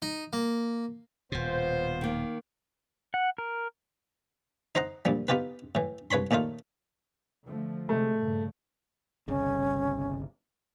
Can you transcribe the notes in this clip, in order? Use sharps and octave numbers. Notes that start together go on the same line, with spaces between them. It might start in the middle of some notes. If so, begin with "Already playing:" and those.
D#4
A#3
D#1 B2 B3 F4 C5
D#3 A#3
F#5
A#4
D#4 C5 D#5 F#5 A#5
D2 A#2 F3 G3
B3 D#4 F4 G4 B4
A2 E3
C2 B4 C#5 B5 C6
D#2 A#2 A3 D#4 F4
D3 F3 A3
C3 G#3 A3
G2 A#2 C#3
G1 C2 C#3 C#4